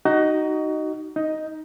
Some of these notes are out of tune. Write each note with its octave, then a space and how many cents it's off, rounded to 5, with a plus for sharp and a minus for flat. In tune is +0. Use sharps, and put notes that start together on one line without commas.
D#4 +0 F#4 +25 D#5 -5
D#4 +10 D#5 +0